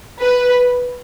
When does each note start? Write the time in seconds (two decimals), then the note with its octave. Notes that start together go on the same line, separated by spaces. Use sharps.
0.20 B4